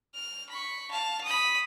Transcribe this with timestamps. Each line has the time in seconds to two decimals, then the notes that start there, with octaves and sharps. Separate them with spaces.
0.14 F6
0.49 B5 C#6
0.91 F5 A5
1.24 B5 D#6